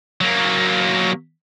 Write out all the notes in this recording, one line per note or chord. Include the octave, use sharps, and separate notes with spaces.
F#3 A#3